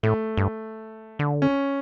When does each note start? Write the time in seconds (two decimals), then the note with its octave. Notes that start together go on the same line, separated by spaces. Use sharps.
0.03 A2 A3
0.37 G2
1.19 D3
1.42 C#4